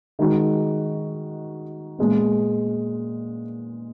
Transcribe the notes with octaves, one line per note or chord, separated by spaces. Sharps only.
D#3 G#3 D#4 F#4
A#2 G#3 B3